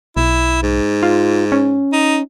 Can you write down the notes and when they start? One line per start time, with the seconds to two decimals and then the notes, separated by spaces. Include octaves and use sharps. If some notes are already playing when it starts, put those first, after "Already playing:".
0.17 B1 E4
0.63 G#2
1.03 F4
1.52 C#4
1.92 D#4